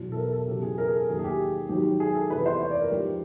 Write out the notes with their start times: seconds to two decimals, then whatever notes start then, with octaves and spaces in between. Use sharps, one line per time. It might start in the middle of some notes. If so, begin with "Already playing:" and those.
Already playing: E2 B2 F#3
0.12 A4
0.17 A#4
0.32 A4
0.48 E2 C#3 F#3 G4
0.63 G#4
0.78 A#4
0.88 G#4
0.93 A4
1.08 D#2 D#3 F#3 G#4
1.19 G#4
1.24 G4
1.69 G#2 D#3 F#3 G4
2.00 G#4
2.15 A4
2.30 E2 C3 E3 B4
2.46 C5
2.61 C#5
2.71 D5
2.81 A#4
2.91 G#2 F3 G4